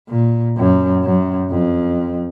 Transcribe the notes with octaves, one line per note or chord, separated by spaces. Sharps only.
A#2
F#2
F#2
F2